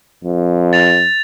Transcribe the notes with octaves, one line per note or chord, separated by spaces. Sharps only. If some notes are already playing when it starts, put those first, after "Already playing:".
F2
A6 F7